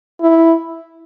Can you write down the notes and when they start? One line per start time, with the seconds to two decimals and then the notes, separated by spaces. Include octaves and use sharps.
0.22 E4